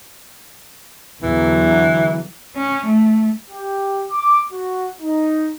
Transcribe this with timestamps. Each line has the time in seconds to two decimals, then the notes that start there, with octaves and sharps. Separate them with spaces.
1.23 E2 D3 E3 F#3
2.55 C#4
2.86 A3
3.50 G4
4.10 D6
4.52 F#4
5.01 D#4